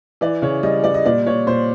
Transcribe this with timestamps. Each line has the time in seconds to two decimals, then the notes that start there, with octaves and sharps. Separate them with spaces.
0.21 E3 D5
0.42 C#3 C#5
0.63 G3 D#5
0.84 G3 D5
0.94 D#5
1.06 A#2 D5
1.27 A#2 C#5
1.47 A#2 C5